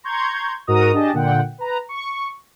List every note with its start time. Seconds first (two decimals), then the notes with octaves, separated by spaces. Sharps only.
0.04 A#5 C6 C#6 G6 G#6
0.67 G#2 F#4 A#4 D#5 A#5 D#6
0.94 D4 G4 G#4 D#5 A5
1.13 A#2 D3 F#5 G5
1.58 B4 A#5
1.89 C#6